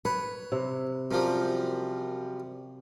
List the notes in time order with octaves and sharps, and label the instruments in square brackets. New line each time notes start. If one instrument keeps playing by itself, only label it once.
[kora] B4 [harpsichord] C#5
[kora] C3
[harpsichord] F#2 F3 G3 [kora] A#4